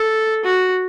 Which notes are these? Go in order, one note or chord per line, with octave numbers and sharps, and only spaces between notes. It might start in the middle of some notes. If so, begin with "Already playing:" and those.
Already playing: A4
F#4